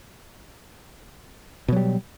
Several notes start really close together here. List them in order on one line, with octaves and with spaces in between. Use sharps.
B2 F#3 G3